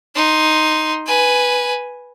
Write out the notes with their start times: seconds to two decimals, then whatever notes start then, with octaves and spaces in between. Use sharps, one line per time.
0.15 D#4 C6
1.06 B4 G#5